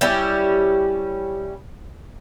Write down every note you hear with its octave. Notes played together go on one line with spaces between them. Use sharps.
G3 C#4 E4 G4